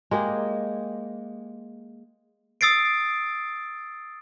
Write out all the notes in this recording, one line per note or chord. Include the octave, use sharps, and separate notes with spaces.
G#3 A#3 G4 G#4
D#6 E6 A6 C7 D7